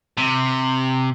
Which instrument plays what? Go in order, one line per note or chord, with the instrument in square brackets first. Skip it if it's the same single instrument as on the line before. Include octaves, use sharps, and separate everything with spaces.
[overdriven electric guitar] C3